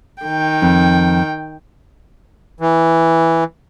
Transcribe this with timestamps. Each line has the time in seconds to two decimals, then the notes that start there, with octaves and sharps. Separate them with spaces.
0.22 D#3 G5
0.62 F2
2.60 E3